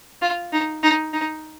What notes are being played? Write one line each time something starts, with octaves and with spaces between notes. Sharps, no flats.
F4
D#4
D#4
D#4